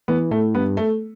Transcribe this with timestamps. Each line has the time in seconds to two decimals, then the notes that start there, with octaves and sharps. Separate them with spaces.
0.08 E3 B3
0.31 A2 A3
0.54 G2 B3
0.77 A3